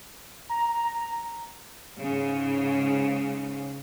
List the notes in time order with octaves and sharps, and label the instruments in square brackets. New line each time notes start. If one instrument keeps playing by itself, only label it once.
[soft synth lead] A#5
[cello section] G#2 C#3